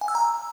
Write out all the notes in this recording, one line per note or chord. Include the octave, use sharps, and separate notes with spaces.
G#5
E6
A#5